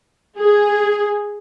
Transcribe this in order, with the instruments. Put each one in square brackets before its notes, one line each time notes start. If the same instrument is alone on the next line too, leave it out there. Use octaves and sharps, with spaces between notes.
[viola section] G#4